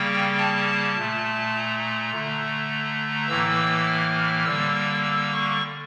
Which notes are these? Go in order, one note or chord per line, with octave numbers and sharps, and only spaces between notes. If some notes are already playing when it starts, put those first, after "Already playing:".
Already playing: C#3 G3 A#3 G5
A5
A#2 A3
A#5
D3 A3
A2 E3 A#3 E6
F6
D3 G3 A#3 E6
E6
C#6